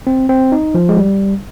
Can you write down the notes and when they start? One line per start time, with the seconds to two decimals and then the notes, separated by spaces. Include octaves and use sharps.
0.07 C4
0.29 C4
0.52 D#4
0.75 F3
0.89 G#3
0.97 G3